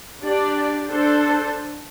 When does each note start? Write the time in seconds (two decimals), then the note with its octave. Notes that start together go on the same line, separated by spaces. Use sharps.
0.22 D4 G4 D5
0.88 D4 A4 C5